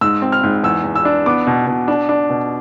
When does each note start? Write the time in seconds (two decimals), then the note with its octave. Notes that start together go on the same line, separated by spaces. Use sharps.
0.01 G#2 E6
0.22 C4
0.32 F6
0.43 G#2
0.64 E2 E6
0.84 E2
0.95 E6
1.05 D4
1.26 B3 D6
1.47 B2
1.67 B2
1.88 D4
2.09 D4
2.30 B2